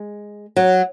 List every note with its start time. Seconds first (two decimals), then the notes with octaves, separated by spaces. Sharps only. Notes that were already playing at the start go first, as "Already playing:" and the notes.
Already playing: G#3
0.56 F#3